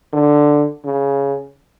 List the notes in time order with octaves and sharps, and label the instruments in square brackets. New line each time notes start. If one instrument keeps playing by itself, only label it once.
[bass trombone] D3
C#3